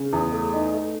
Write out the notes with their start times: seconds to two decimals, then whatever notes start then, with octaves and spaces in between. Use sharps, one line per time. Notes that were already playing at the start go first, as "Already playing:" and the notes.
Already playing: C#3
0.13 E2
0.32 A3
0.53 D#4
0.74 A3